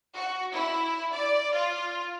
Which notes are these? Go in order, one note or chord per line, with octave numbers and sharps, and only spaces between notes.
F#4
E4
D5
F4